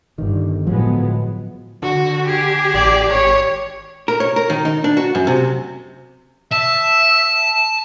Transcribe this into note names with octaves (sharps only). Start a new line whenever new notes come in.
G1 D#3
A2 D3 F3 F#3 G#3 B3
D3 F#4
G4 G#4
A1 D5
G#1 C#5
A#4
C#5
A#4
D#3
D#4
D4
F#4
F#2
C3
E5 A5